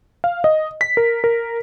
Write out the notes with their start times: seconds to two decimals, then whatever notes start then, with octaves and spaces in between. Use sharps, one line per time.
0.24 F5
0.44 D#5
0.81 B6
0.97 A#4
1.24 A#4